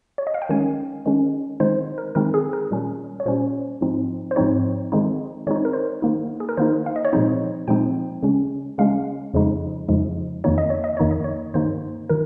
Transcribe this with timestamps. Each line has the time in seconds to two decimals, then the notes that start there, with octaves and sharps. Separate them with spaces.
0.18 C#5
0.27 D#5
0.34 F5
0.42 G5
0.49 D#3 G#3 C#4 G#5
1.06 D#3 G#3 C#4
1.60 D#3 G#3 C4 D#4 C5
1.98 A#4
2.15 D#3 G#3 C4 D#4 A#4
2.34 G#4
2.53 A#4
2.71 A#2 G3 C#4
3.20 C#5
3.26 A#2 G3 C#4 C5
3.81 G#2 F3 C4 D#4
4.31 C5
4.36 G#2 F3 C4 D#4 C#5
4.92 D#3 G#3 C4 D#4
5.47 D#3 G#3 C4 D#4 C#5
5.56 C5
5.65 A#4
5.73 C5
6.02 D#3 A#3 D#4
6.40 G#4
6.49 A#4
6.57 D#3 A#3 D#4 C5
6.86 F5
6.96 D#5
7.05 C#5
7.13 A#2 F3 G#3 C4 D#4 C5
7.68 A#2 F3 G#3 C4 D#4 G5
8.23 C#3 G#3 C#4
8.78 C#3 G#3 C#4 F5
9.34 F2 C#3 F3 G#3 D#4
9.88 F2 C#3 F3 G#3 D#4
10.44 F2 D#3 A#3 D#4 C#5
10.58 D#5
10.70 C#5
10.84 D#5
10.97 F2 D#3 A#3 D#4 C#5
11.11 D#5
11.24 C#5
11.54 G2 D#3 A#3 D#4 C5
12.09 D#3 A#4